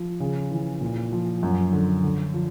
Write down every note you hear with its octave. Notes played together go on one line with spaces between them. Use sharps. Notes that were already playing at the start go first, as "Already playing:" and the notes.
Already playing: F3
C#3
E3
A#2
F3
F#2
D3
D3
F3